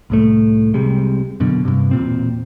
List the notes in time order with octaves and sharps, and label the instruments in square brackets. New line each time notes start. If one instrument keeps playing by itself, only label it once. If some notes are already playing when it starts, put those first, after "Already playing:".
[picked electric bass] C2 A2 A3
C2 C3 G3 G#3
F#2 B2 D3
G2 C3
E1 A#2 C4